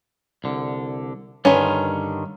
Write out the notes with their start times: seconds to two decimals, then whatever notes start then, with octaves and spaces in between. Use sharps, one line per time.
0.44 C2 D3
1.45 G2 D3 D#3 C#4 B4